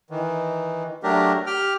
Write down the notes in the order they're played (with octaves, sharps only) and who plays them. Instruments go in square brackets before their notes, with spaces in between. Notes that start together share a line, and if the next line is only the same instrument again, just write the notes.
[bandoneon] D#3 E3
F#3 A3 D4 G4 A#4
G4 G5 F6